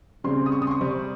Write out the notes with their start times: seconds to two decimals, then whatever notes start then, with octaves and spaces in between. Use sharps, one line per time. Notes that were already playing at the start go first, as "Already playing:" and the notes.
0.24 C#3 G3 C4 C6
0.46 D#6
0.52 C#6
0.62 D#6
0.67 C6
0.71 C#6
0.81 C3 G3 C4